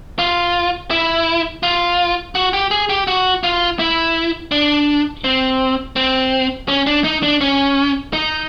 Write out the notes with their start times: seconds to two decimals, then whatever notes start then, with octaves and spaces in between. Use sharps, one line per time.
0.19 F4
0.91 E4
1.63 F4
2.35 F#4
2.53 G4
2.71 G#4
2.89 G4
3.07 F#4
3.43 F4
3.79 E4
4.51 D4
5.24 C4
5.96 C4
6.68 C#4
6.87 D4
7.04 D#4
7.23 D4
7.41 C#4
8.13 D#4